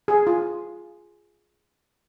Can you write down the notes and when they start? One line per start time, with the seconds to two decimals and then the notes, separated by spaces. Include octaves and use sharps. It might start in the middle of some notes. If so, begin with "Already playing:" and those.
0.08 G#4
0.27 F4